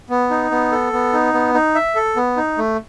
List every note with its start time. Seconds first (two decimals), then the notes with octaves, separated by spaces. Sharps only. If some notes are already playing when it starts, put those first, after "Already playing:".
0.10 B3
0.30 D#4
0.51 B3
0.72 A4
0.93 B3
1.13 D#4
1.34 B3
1.54 D#4
1.75 E5
1.95 A4
2.16 B3
2.37 D#4
2.58 A3